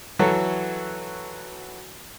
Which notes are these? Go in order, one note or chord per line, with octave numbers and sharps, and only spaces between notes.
E3 F#3 F#4 A4 C#5